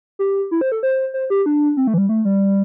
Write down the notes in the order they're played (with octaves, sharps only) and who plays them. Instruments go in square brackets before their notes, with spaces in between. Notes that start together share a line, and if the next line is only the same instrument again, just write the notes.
[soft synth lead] G4
E4
C5
A4
C5
C5
G4
D4
C4
A3
E3
G3
A3
G3